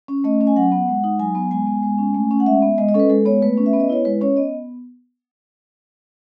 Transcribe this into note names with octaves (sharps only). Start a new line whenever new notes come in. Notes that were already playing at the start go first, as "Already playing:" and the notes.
C#4
A3 D#5
C#4
G#5
F#3 F#5
B3
G#3
D#4
F#3 G#5
B3
G#3 G#5
B3
G#3
C#4
A3
C#4
F#5
G#3 E5
B3
G#3 D#5
D#5
C#4 A4
B4
G#3 A4
B3 C#5
A3 B4
C#4
E5
B3
D#5
E4 C#5
G#3 B4
C#4 C#5
B3 D#5